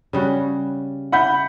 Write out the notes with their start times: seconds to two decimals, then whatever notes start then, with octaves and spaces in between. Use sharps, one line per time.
0.13 C#3 G3 F#4
1.12 F#5 B5 G6